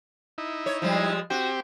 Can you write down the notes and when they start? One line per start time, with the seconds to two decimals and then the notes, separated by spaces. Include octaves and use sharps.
0.38 D#4 E4
0.66 C#5
0.82 F3 G3 G#3
1.30 C4 F#4 G4